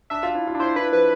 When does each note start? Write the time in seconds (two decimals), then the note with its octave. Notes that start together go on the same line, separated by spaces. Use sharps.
0.10 D4 E5
0.23 F4
0.35 E4
0.47 F4
0.55 D4
0.60 E4 C5
0.76 E4 B4
0.92 F3 B4